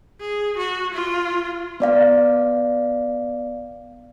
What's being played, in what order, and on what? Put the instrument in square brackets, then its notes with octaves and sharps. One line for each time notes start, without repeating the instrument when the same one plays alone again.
[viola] G#4
F#4
F4
[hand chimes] B3 D5 F5